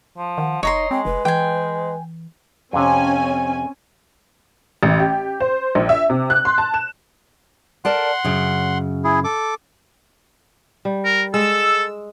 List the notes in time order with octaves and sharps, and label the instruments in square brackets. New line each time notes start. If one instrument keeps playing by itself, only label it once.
[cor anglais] F3
[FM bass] D#3 [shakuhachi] F#5
[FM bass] F1 [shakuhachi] D#4 [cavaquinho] C#5 A#5 C6 [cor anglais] D#5
[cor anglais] G#3 [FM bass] C4 [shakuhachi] G5
[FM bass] F1 [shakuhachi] B4
[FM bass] E3 [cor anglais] G#3 [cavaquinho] G5 G#5
[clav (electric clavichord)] F2 C3 [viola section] C4 C#4 G#5
[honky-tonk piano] A1
G4
C5
A#1
E5
C3
F#6
C6
A5
E7
[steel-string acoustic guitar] A#4 D5 A5 [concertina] F#5 C6
[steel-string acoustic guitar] F#2 C#3
[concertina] E4 G#4
A4 D6
[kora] G3
[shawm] A#4
[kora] G#3 [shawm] A4 [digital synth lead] E6